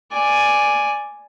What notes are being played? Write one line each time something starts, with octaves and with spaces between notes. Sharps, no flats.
D5 G#5